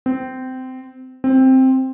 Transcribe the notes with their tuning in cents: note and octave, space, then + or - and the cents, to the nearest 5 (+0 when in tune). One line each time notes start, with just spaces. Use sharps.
C4 -20
C4 +5